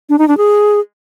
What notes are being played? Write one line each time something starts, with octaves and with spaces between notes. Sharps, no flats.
D4
D#4
D4
G#4